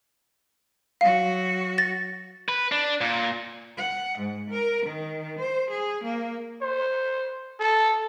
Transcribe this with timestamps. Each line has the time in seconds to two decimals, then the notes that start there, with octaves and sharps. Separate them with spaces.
1.01 F#3 F#4 F5
1.78 A6 A#6
2.49 B4
2.72 D4
3.01 A#2
3.78 F#5
4.18 G#2
4.50 A#4
4.86 D#3
5.39 C5
5.70 G#4
6.04 A#3
6.62 C5
7.60 A4